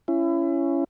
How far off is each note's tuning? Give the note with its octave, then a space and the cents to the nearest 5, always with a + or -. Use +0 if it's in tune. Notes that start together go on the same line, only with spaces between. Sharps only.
C#4 +0 E4 +30